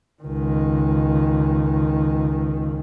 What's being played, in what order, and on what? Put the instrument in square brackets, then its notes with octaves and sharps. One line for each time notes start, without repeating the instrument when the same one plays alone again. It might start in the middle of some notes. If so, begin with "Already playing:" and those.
[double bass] C#2 D#3